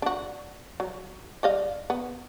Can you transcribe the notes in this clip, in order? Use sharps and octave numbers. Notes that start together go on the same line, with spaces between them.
D4 F#4
F#3
G3 D#5 F5
B3